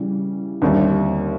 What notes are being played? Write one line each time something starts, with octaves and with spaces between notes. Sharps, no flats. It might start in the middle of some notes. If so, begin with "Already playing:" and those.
Already playing: C#3 E3 G3
D#2 D3 G3 C4 E4